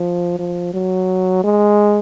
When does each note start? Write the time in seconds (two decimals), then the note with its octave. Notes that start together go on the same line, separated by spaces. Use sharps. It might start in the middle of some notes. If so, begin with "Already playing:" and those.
Already playing: F3
0.39 F3
0.74 F#3
1.44 G#3